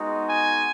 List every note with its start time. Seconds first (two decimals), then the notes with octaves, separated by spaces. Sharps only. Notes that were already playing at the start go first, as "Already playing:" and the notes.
Already playing: G#3 B3 D#4 F#4
0.28 G#5